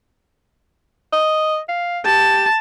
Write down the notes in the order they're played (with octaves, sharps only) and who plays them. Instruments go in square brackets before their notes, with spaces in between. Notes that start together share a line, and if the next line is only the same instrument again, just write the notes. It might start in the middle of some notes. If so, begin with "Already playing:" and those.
[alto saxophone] D#5
F5
[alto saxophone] G4 [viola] A5